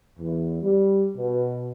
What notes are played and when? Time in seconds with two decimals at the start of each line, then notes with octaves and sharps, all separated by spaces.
0.18 E2
0.62 G3
1.15 B2